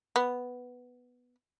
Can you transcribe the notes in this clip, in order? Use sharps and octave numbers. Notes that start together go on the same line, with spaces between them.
B3